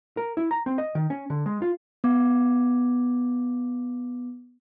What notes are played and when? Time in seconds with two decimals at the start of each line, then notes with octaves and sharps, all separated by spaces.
0.17 A#4
0.37 E4
0.51 A#5
0.66 C4
0.78 D#5
0.95 D#3
1.10 C#4
1.30 D3
1.46 G#3
1.62 F4
2.04 B3 D6